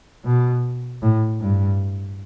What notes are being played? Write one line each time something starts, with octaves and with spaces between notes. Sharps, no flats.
B2
A2
G2